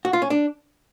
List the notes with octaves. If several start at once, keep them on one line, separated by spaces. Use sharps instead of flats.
F#4
F4
C#4
D4